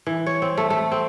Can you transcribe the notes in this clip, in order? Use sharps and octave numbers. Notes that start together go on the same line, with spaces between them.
E3
C#5
C4
A3
A3
C4